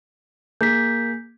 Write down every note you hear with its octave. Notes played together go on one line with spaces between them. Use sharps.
A#3 G#4 G6 B6